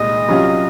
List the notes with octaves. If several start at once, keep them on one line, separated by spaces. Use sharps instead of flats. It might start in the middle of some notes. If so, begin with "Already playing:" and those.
Already playing: C2 A#2 G#3 D#5
C2 C3 F#3 C#4 F4